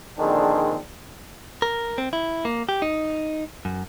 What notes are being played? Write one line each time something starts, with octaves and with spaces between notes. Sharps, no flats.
A#1 D3 D#3 C4 D4 G#4
A#4
C4
E4
A#3
G4
D#4
F#2